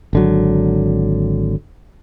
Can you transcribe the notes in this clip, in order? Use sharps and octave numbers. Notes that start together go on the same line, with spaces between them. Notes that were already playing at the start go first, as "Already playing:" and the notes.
G#1 D3 F#3